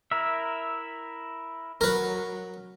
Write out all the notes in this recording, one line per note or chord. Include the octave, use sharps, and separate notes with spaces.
E4 A#4 E5
F#3 A#4 B4